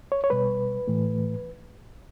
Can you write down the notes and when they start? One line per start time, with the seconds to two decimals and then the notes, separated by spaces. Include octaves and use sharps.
0.12 C#5
0.24 C#5
0.30 B2 G3 B4
0.88 A2 E3 A3